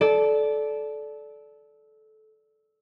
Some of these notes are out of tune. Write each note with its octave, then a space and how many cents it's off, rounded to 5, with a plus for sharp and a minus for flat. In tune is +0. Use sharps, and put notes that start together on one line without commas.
A4 -20 D5 -5